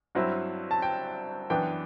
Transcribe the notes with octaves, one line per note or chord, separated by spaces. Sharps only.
G2 F#3 C4 E4
A5
G5
F#2 E3 B3 D4 G5